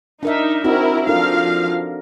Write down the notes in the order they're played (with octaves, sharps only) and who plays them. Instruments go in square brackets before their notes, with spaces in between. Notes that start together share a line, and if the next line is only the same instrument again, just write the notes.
[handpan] D4 A#4 E5 [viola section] D#4
[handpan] C4 D#4 F#4 [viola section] E4 A#4
[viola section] F3 F5 [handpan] D4 A4 A#4